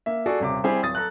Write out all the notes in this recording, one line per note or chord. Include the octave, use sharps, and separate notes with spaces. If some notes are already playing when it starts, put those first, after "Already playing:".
A#3 E5
F#4 G#4 A4 D5
D#1 C3 D6
G3 C4 E4 G4 G#4
D1 D#6 A6
A4 A#5 F#6